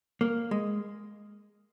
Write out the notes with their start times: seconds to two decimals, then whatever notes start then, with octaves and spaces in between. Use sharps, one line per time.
0.21 A#3
0.51 G#3